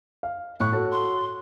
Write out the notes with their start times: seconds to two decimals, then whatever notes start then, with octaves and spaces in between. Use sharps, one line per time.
0.23 F5
0.60 A2 C#6 F#6
0.72 F#4 A4 C#5
0.91 C6